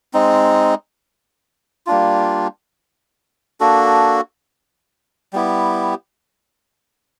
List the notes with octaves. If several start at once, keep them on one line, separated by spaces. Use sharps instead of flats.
G#3 C4 D#4
G3 A#3 D4 F4
A#3 D4 F#4 A4
G3 B3 E4 G4